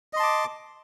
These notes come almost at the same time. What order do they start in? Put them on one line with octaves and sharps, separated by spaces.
D#5 C6 A5 D6